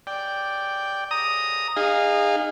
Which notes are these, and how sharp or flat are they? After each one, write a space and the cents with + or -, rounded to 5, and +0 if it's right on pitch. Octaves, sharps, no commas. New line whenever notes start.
D5 +0 G5 +0
A#5 +0 D#6 +0
D#4 -20 G#4 -25 F5 +0